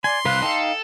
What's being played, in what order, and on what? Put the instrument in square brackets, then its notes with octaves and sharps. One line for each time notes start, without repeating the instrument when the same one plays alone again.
[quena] D5 [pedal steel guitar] G#5 [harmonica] C6
[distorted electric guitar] C2 [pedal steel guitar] B4 F5 [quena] F#6
[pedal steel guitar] D#4 F5 [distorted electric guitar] A4 [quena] G5